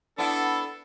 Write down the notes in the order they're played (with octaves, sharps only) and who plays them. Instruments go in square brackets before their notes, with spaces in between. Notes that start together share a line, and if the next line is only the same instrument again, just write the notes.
[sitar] B3 E4 [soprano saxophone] D4 [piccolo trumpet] A4